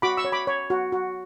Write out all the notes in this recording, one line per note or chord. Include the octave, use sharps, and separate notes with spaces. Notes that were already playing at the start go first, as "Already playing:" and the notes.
F#4 B5 D6
C#6 E6
C#5
B5 D6
C#5
F#4
F#4